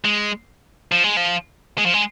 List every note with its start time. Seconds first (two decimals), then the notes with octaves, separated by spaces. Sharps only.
0.05 G#3
0.92 F3
1.04 G#3
1.17 F3
1.78 G#3
1.86 F3
1.94 G#3